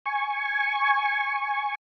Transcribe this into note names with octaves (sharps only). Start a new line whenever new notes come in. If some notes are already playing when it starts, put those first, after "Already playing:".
G#5 C#6